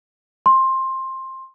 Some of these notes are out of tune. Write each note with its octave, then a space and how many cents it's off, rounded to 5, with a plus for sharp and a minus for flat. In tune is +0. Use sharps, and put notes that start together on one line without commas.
C6 +15